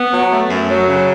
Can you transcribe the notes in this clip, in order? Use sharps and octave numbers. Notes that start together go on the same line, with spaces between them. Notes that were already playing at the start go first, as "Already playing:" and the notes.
Already playing: B3
F#3
A3
F#2
F#3
C#3